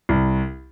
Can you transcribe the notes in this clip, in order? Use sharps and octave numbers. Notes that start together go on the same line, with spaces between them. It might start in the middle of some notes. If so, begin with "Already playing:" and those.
C2